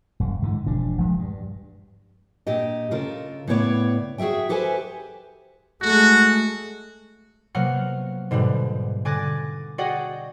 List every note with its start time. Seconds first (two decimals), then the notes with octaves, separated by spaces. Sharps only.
0.20 D#1 F#2
0.42 G#2 D3 E3
0.67 E1 F3 D4
0.98 D#1 F3 G#3
1.19 G2
2.47 A#2 D4 G4 D#5
2.91 C#3 F4 A4 A#4
3.48 A2 C#3 B3 C#5 D5
4.18 F#4 G#4 A4 E5 G5
4.49 G4 A4 B4 C5 G#5
5.82 G#3 A3 F#4
7.54 C3 F#3 A#3 B3 F#5 F6
8.31 G#2 B2 D3 G3
9.05 D3 G#5 D6 F#6 A6 A#6
9.78 F#4 G#4 D5 D#5 F#5 G5